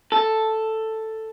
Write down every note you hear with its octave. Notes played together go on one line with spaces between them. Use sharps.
A4